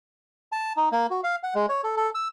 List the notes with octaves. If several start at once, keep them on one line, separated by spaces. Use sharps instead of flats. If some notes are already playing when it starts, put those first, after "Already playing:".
A5
D#4
A#3
F#4
F5
F#5
G#3
C#5
A4
A4
E6